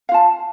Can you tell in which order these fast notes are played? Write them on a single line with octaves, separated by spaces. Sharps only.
F5 F4 A5